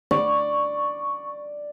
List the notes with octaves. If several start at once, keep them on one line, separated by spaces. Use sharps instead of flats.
D5 C#6